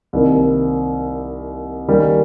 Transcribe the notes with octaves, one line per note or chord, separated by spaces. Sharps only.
C2 C3 D#3 A#3
D#3 G3 A#3 C#4